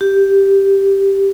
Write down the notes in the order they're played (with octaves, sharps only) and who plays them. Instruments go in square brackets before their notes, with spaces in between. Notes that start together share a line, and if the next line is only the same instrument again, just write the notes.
[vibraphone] G4